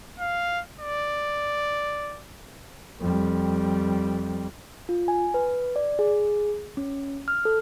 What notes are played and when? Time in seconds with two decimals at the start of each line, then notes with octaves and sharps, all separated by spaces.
0.20 F5
0.80 D5
3.00 F2 G3
4.89 F4
5.08 G#5
5.34 B4
5.76 D5
5.99 G#4
6.77 C#4
7.28 F6
7.45 A4